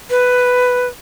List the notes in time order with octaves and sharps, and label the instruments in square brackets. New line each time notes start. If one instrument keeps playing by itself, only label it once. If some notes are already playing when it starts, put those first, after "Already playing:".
[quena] B4